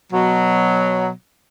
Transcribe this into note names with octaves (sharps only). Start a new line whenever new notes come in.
B2 F#3